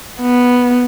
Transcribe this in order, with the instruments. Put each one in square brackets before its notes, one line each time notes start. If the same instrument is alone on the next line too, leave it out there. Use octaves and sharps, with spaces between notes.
[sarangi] B3